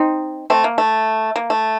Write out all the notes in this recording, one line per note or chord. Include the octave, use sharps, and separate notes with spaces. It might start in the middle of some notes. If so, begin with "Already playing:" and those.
Already playing: C4 D#4
A3 C4
A#3
A3
A#3
A3